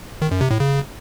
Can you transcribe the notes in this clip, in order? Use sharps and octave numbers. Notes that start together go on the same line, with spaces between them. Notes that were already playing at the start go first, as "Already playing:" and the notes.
D#3
F#2
C3
A2
C#3